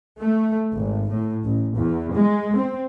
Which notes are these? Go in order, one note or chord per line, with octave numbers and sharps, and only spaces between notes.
A3
G#1
A2
A1
E2
G#3
C4